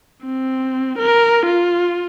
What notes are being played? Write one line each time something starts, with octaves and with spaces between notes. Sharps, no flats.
C4
A#4
F4